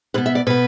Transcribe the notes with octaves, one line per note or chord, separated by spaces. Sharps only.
B2 B3 B4
E5
D5
B2 B3 B4